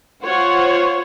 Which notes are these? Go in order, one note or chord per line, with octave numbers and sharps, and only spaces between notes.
F4 C5 C#5 F#5